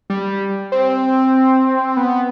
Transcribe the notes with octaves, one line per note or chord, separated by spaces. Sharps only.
G3
C4
B3